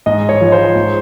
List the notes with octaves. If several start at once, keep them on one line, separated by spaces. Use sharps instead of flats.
G#2 D#5
C#5
F3 G#3
C5
G#2